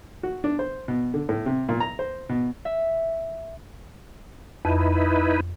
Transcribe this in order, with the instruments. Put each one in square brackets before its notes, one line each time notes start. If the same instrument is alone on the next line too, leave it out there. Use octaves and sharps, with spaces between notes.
[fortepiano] F#4
D4
C5
B2
D3
A2
C3
A#2
A#5
C5
B2
[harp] E5
[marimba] F2 [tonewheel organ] D#4 E4 B4